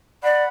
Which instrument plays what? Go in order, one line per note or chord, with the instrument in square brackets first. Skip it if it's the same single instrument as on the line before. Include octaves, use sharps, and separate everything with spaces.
[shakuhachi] D5 [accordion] F#5 B5